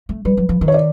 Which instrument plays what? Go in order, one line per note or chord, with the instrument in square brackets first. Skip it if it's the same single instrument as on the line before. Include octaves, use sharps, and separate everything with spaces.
[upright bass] A3
[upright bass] G3 [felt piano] B4
[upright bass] F#3
F3
D#3
[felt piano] C#5
D5